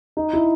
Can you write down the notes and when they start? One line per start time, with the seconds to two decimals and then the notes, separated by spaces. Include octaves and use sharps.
0.17 D#4
0.33 E4